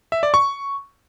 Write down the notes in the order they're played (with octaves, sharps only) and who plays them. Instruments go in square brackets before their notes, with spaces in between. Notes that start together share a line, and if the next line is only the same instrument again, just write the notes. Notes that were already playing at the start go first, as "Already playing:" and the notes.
[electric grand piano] E5
D5
C#6